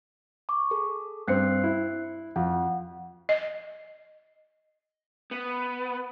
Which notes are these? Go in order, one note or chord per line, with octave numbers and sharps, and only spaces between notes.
C#6 D6
G#4 A4
G2 C4 F#6 C7 C#7
E4
F2 F#5
D#5
B3